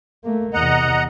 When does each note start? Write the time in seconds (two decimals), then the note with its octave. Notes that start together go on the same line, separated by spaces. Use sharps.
0.24 A3 A#3
0.53 E2 C3 D#5 F#5 A#5